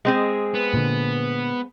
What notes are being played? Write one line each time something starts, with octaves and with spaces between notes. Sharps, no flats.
G#3 C4 G#4
B3
A#2 D3